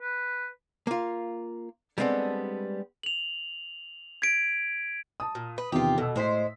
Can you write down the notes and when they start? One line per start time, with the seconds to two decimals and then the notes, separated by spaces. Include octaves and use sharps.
0.01 B4
0.87 A#3 F4
1.98 G3 G#3 B3 C4 D4 A4
3.03 F7 F#7
4.22 G#6 B6 D7
5.20 A5 D#6
5.35 A#2
5.58 B4
5.72 E2 C3 D#3 F4 G4
5.98 B2 A4 E6
6.16 A2 G#3 C5 C6 B6